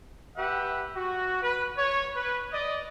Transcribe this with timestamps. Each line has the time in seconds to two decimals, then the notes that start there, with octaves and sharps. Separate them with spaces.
0.37 G4 B4 E5 F#5
0.95 F#4
1.42 B4
1.77 C#5
2.16 B4
2.53 D5 D#5